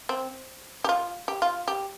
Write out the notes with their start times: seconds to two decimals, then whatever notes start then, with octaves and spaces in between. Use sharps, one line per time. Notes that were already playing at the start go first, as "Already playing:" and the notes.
0.09 C4
0.84 G4
0.89 F4
1.28 G4
1.42 F4
1.68 G4